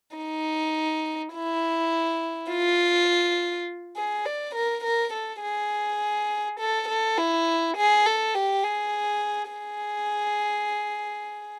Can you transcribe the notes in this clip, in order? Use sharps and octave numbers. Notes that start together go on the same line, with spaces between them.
D#4
E4
F4
G#4
D5
A#4
A#4
A4
G#4
A4
A4
E4
G#4
A4
G4
G#4
G#4